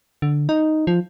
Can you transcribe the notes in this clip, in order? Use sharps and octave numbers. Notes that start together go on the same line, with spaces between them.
D3
D#4
F3